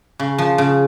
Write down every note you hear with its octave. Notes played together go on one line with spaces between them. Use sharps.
C#3
F3
C#3